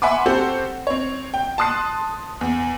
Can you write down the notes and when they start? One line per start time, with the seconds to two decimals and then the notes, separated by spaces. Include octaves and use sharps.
0.02 E5 F#5 G#5 B5 C6 D6
0.26 C4 F#4 G4 A4 C5
0.87 C4 C#5
1.34 G5
1.58 A5 C6 D#6 F#6 C7
2.41 E2